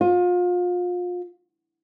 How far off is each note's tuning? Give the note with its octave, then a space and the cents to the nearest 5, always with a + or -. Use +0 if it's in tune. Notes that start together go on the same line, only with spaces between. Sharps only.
F4 +30